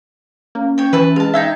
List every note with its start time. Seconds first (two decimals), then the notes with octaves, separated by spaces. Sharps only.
0.55 A#3 C#4
0.78 C#5 G5
0.93 E3 B4 E5 A5
1.16 G#3 F5 A5
1.34 D#4 E5 G5 A5 E6 G#6